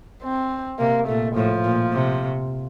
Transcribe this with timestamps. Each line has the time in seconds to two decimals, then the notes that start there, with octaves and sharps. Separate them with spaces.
0.23 C4
0.80 C3 A#3
1.08 A#2 A3
1.36 A2 F3
1.64 A#2
1.93 C3